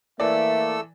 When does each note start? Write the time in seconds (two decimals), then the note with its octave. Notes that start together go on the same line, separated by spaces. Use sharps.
0.20 E3 A3 A#3 A4 D5 E5 E6